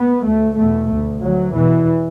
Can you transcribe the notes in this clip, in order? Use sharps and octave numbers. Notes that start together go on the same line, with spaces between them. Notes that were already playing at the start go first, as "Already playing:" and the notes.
Already playing: B3
D2 A3
E2 B2 A3
D2
D2 F#3
E2 B2 E3